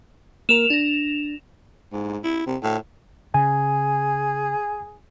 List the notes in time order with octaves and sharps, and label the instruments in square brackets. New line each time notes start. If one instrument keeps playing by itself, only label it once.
[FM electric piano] A#3 A#4 [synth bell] E7 F7
[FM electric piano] D4 A#6
[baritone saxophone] G#2
E4
C3
A2
[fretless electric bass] C#3 [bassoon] G#4 [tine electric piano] G#5